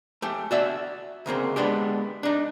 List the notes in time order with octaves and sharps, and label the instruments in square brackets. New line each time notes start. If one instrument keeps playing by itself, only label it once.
[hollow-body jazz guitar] A3 G4
F#4 D5 E5
D2 C#3 A#3 C4
G#3 B3 D4 G4
D4 D#4